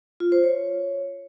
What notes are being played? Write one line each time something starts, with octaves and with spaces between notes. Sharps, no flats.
F4
C5
C#5